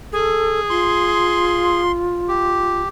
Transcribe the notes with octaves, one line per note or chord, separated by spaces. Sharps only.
G#4 A4
F4 C6
G4